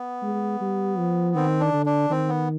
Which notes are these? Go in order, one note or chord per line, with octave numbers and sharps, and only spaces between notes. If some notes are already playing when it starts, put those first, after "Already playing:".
Already playing: B3
G#3
G3
F3
D#3 C4
D4
D3
D4
D#3 C4
B3